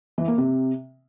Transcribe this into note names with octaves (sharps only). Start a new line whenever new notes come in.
E3
A#3
C3